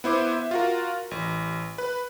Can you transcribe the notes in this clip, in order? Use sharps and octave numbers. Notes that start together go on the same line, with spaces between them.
B3 E4 C5 D6
E5
F4 F#4 A#4
A1
B4